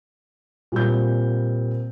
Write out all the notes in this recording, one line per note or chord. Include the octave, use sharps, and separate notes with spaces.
A#2 G3 C4 G6